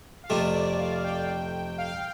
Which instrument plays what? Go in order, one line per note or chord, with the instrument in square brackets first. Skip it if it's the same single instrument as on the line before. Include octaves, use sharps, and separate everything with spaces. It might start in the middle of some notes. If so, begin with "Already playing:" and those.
[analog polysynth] F5
[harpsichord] F2 C3 A3 F4 [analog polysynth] D5
[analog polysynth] D5
F5
G5
F5